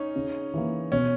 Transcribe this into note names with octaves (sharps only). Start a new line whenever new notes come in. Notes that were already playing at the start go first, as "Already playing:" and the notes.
Already playing: C#4 D#4
C#3
E3 A#3
B2 C#4